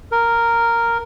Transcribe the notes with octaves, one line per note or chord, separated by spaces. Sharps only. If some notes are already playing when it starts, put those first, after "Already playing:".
A#4